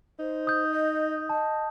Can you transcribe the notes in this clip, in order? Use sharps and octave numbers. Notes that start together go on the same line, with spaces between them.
D#4 C5
D#6 G6
D#5
D#5 A5